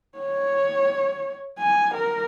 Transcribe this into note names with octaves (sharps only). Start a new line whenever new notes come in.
C#5
G#5
A#4